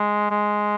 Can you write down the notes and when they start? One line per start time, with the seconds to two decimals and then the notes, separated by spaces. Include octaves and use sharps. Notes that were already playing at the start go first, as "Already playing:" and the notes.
Already playing: G#3
0.30 G#3